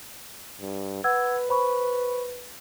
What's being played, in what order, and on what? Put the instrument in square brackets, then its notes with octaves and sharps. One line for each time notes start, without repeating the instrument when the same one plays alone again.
[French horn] G2
[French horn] B4 [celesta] F#5 E6 G#6
[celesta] C5 B5 C#6